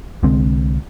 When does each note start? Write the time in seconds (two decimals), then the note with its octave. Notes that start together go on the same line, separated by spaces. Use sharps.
0.23 C2 D3 G#3 C4